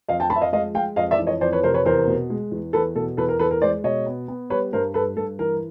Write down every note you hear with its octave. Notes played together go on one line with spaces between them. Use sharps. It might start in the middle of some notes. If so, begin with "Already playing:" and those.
F2 D#5 F5
G5 A5
F3 A5 B5
E5
D#5 F5
G#3 D#5 F5
G#3 F5 G5
F2 D#5 F5
D5 E5
E3
C#5 D#5
F2 C5 D5
B4 C#5
C3 A#4 C5
B4 C#5
E2 A#4 C5
B2
G#3
E2
E2 A4 B4
B2 A4
E2 A4 B4
A#4
E2 A4 B4
A#4
G#3 C5 D5
B2 C#5 D#5
B3
B3
G3 B4 C#5
G2 A#4 C5
G2 A4 B4
G2 A4
E3 A#4